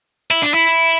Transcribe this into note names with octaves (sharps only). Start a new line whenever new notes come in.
E4
D4
E4